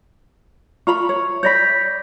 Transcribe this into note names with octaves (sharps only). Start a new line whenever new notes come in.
F4 A#5 B5 C#6
C#5
C#5 D5 B5 G6 A#6 B6